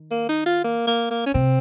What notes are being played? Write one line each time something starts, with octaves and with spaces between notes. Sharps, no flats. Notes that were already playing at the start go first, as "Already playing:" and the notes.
Already playing: D#3
A#3
D#4
F4
A#3
A#3
A#3
C#4
C3 C4